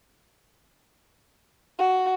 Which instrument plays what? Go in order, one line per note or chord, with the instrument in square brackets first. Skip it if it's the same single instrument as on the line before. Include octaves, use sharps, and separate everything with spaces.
[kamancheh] F#4